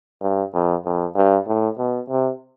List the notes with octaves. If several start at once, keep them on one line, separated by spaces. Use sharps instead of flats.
G2
F2
F2
G2
A2
B2
C3